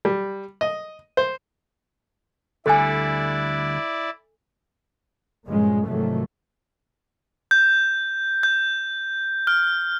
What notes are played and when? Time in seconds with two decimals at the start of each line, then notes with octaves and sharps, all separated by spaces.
0.05 G3
0.61 D#5
1.17 C5
2.66 D2 D3 G3 E4 A4 D5 G#5
5.46 G2 A#2 C#3 F3 G#3
5.88 G#2 C3 D#3 F3 F#3 A3
7.51 G6
8.43 G6
9.47 F6